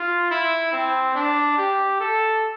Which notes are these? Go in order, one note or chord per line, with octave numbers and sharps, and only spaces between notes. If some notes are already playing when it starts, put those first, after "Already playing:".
Already playing: F4
E4
C4
D4
G4
A4